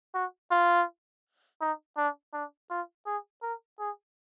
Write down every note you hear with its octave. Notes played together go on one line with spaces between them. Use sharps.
F#4
F4
D#4
D4
D4
F4
G#4
A#4
G#4